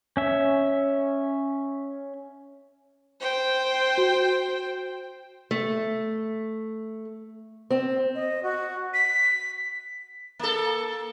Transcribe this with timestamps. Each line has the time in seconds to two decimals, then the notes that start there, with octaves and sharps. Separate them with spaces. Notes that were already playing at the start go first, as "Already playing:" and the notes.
0.17 C#4 E5
3.20 C5 G5
3.98 F#4
5.51 A3
7.70 C4
8.15 D#5
8.43 F#4
8.94 B6
10.39 A#3 A4